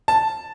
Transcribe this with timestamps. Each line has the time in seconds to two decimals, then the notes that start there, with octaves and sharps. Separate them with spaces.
0.08 A5